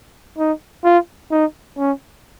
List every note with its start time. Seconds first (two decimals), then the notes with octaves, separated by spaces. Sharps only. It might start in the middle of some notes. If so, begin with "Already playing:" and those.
0.38 D#4
0.84 F4
1.31 D#4
1.77 C#4